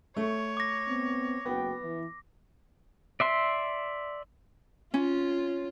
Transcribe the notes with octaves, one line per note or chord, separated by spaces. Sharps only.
A3 C#5
D6 A#6
B3 C4
F#1 B3 F#4 G5
E3
D5 E5 C6
C#4 F4